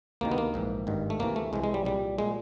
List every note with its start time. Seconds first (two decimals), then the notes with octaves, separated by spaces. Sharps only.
0.21 D2 C3 D#3 A#3
0.32 B3
0.38 A#3
0.54 A#1 G#2 E3
0.87 G#1 G2 D#3
1.10 A3
1.19 D2 C3 E3 A#3
1.36 A3
1.53 C2 C3 E3 G#3
1.64 G#3
1.74 G3
1.85 C2 A#2 G3
2.18 A#2 G#3